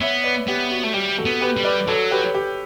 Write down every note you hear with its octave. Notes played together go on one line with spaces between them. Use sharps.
B3 C#5 E5
B4 D5
B3 G4
F#4
A3
G3 G4
F#4 A4
B3
G4 B4
G3
B4 D5
F#3 A4 C#5
G4 B4
G4